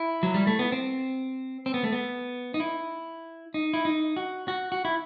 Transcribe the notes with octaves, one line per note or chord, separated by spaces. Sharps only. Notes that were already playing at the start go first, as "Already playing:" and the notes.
Already playing: E4
F#3
G3
A3
B3
C4
C4
B3
A3
B3
D#4
E4
D#4
E4
D#4
F#4
F#4
F#4
E4